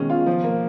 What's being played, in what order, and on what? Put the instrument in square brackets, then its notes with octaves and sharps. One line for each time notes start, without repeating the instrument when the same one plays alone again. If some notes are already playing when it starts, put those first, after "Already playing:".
Already playing: [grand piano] B2 D#3 [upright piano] G#3 C#4
[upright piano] F4
F3
A#3